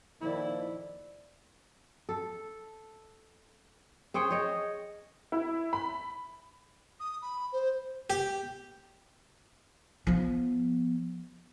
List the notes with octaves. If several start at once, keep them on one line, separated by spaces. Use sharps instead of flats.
F2 A#2 D#3 F3 E4 D5
A4
C4 G#4 C#5 G5
G#4 C#5 D#5
E4
B5
D#6
B5
C5
G4
F3 B3